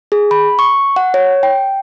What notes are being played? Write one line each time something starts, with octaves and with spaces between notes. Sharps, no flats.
G#4
B5
C#6
F#5
C#5
G5